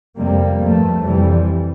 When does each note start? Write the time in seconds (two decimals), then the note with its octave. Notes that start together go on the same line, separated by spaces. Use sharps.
0.17 F2 C3 G3 A#3
0.60 G2 F3 A3
1.02 F2 C3 E3 G3